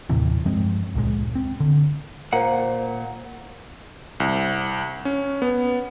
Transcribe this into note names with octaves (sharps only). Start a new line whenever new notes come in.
D#2 A2 C3 E3
G2 F3 G#3 C4
C#2 A#2 G#3
C4
D3
A#2 A#4 C5 F5 F#5 A#5
C2
C#4
B3